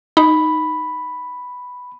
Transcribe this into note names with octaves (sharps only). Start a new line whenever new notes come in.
D#4 B5